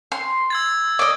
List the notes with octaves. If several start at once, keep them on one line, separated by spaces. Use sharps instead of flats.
C6
E6 G#6 A6
D5 D#5